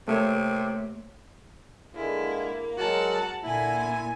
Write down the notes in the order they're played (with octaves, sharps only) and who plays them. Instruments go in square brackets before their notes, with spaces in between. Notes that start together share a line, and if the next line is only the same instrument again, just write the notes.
[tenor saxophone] C3 [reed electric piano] A3 A#3 C#5
[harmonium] D3 G#3 F4 [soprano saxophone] A#3 [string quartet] E4
[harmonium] F#3 G#3 A#4 [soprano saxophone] F#4 [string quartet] F#5 A5
[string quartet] A#2 G#5 [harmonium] D3 [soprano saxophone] E4